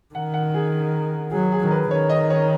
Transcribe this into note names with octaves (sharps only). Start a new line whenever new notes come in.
D#3 F#5
F#5
G#4
F#3 G#4
G#4
D#3
B4
D#3 C#5
D#5
C#5